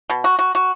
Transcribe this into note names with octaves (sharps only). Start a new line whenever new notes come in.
B2
F#4
F#4
F#4